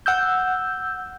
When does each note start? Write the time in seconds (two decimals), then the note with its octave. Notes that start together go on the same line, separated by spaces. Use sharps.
0.06 F#5 E6 G6